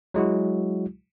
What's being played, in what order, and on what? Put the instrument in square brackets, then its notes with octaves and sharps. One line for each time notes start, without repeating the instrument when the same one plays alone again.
[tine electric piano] F#3 G#3 E4 F#4